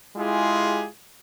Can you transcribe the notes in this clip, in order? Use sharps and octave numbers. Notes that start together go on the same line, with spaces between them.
G#3 E4 F4 G4 G#4